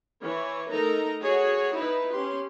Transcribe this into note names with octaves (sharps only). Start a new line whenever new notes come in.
E3 C#5
A3 D#4 A4 A#4 A#5
F#4 G#4 C#5
D#4 E4 B4
C#4 G4 C6